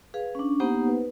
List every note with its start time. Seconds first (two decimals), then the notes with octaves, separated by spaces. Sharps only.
0.14 G#4 B4 F5
0.35 C#4 D4
0.60 A#3 B3 D#4 G4 C5 F#5
0.88 B4